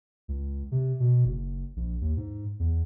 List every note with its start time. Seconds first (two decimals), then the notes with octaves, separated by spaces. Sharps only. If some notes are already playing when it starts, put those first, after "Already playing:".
0.28 C#2
0.72 C3
1.00 B2
1.25 F#1
1.76 A#1
2.01 D#2
2.17 G#2
2.59 E2